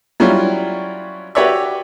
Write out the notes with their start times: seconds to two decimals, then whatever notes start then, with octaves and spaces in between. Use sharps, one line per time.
0.20 F#3 G3 C#4 E4 F4
1.35 F#4 G4 B4 C#5 D5 E5